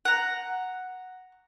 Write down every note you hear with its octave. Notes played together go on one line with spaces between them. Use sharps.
F#5 A#5